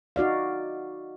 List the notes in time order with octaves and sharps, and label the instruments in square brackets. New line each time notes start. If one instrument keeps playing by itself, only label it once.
[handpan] D#4 F#4 D5 F5